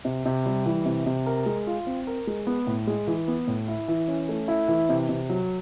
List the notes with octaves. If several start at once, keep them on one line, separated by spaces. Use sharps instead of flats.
C3
C3
G3
E3
C3
C3
A#4
G#3
F4
C4
A#4
G#3
B3
A2
G#3
E3
B3
A2
E4
E3
C#4
A3
E4
E3
C3
C3
F#3